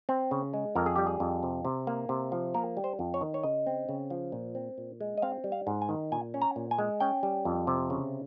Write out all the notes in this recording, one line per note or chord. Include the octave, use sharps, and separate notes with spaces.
C4
C#3
G#3
F2 A#4
G#4
G3 G4
G#4
F2
C3
C3
A#3
C3
F3
A#3 A#4
G3
C5
F2
C#5
D#3
C#5
C#3 D#5
C4
C#3
F3
A#2
C4
A#2
G#3
D#5
C4 F5
G3
F5
G#2
G#5
D#3
A#2 G#5
C#4
A#5
A#2
G#5
G#3
C#4 G5
G3
F2
C3
C#3